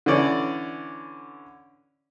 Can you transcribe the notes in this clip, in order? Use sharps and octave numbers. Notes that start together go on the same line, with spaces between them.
D3 E3 C#4 D5